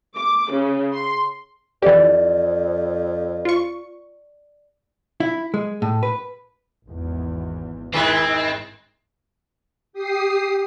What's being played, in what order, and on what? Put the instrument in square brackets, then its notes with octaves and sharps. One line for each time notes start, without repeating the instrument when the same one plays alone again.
[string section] D6
C#3
C6
[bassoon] F2 [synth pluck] E3 G4 [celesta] D5
[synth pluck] F4 C#6
[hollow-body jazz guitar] E4
G#3
A2
B4
[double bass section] G#1 E2
[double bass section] G#2 [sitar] D#3 G#3 E4 [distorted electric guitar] C4
[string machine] G4 D#6 C7